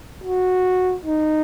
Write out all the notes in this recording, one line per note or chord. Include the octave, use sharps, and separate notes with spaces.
F#4
D#4